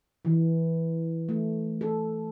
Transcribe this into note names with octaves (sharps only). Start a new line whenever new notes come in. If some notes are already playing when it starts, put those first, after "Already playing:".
E3
A3
A4